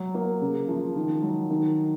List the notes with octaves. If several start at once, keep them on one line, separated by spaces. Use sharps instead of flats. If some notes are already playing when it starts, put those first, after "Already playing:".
Already playing: F#3
A#3
C#3
F3
D#3
F#3
D#3